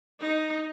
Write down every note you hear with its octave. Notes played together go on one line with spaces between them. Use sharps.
D#4